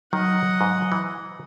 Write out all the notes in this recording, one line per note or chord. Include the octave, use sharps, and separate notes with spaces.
D#3 F#3 D#5 F#5
G#2
E3